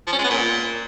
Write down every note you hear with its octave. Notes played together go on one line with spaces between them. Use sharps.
F3
C#4
G#3
B3
A#2